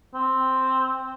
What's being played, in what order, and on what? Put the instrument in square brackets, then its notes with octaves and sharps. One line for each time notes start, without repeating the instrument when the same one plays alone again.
[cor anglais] C4